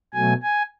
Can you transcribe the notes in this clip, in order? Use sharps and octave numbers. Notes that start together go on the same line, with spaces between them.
B2 F#3 A3 G#5
G#5